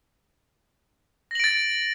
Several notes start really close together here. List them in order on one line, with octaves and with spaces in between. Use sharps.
A#6 F#7 D7 A6